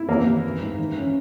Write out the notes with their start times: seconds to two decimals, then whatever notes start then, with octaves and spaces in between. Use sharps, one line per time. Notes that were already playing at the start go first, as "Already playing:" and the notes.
Already playing: E4
0.08 E3 A#3
0.26 E3
0.43 E3
0.61 G#2
0.78 E3
0.96 C#4